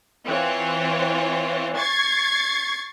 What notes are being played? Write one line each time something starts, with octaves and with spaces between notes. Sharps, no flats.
E3 C4 F4 C#5
C#6 G#6 A6 C7